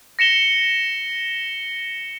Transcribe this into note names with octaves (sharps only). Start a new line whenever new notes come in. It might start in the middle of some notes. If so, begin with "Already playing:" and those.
A#6 C#7 E7 G7